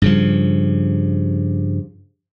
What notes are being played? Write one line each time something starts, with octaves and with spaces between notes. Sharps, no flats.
G2 C#3 F3